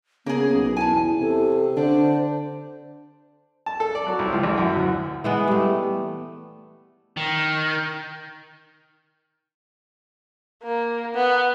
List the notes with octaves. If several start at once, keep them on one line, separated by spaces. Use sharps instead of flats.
C#3 A#3 B3 G#4
B1
E4 G#5 A5
E2
C3 A4
D3 D4 C5
A5
A4
D5
F#3
C2
C#2
A1
F#2
D2
E3 G#3 B3
G3 A3
D#3
A#3
B3